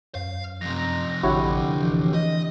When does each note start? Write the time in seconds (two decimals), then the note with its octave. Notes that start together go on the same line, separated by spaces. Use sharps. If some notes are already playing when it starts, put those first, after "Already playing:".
0.15 F#2 F5
0.61 F2 C3 A#5
1.23 A1 D3 E4 F#4 G4 C#5
1.77 E3
2.14 D#5